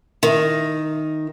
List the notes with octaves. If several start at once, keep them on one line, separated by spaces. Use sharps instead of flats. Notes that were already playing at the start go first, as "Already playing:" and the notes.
D#3